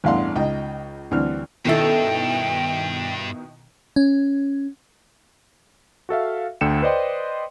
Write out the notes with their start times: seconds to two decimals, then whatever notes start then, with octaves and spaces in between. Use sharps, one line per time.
0.04 A1 E2 G2 F5 F#5 C6
0.35 C#2 D#4 D#5 G5
1.11 D2 E3 G3 C4 F6
1.65 G2 B2 D#3 C#4 E4 A4 G5
3.96 C#4
6.09 F#4 A4 E5 F5
6.61 D2 D3 G5 C#7 E7
6.82 B4 C5 D5 D#5 G5 C6